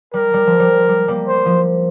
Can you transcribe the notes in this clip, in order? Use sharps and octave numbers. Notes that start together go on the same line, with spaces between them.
G3 A#4
G3
F3
G3
G3
G3 A#3
C5
F3